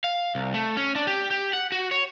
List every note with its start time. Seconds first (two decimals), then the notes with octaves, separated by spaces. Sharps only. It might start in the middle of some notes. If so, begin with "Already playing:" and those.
0.04 F5
0.35 C2
0.54 A3
0.77 C#4
0.96 D4
1.07 G4
1.31 G4
1.53 F#5
1.72 F#4
1.91 C#5